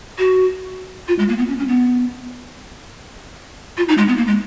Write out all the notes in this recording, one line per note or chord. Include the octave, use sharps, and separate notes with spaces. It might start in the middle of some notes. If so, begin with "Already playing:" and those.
F#4
F4
G#3
A#3
B3
C#4
C#4
B3
F4
D#4
G#3
B3
A#3
G#3